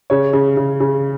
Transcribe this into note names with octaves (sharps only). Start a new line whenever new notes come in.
C#3 C#5
C#3
C#3
C#3